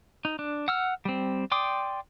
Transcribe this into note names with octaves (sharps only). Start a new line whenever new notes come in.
D#4
D4
F#5 E6 F6
G3 C4
D5 G5 C6 D6 D#6